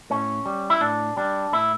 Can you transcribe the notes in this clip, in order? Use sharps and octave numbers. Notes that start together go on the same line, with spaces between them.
A2 C#4
G3
E4
A2 D4
G3 D4
A2 E4